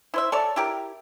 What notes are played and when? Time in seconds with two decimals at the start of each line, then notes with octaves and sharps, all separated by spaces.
0.14 E4 C5 E5
0.32 A4 C#5 D5
0.56 E4 G4 A#4